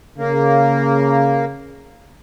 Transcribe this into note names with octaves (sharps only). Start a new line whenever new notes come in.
C#3 A#3